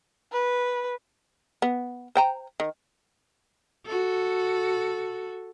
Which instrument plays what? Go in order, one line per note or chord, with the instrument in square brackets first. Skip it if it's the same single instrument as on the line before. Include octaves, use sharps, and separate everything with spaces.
[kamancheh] B4
[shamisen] B3
C5 G5 A#5
D#3
[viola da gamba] F#4 A4